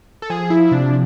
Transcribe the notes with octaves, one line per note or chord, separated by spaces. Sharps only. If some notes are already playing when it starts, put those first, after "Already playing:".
A4
F3 G#4
E4
C3 D4